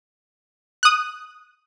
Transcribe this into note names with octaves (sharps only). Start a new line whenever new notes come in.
D#6 F#6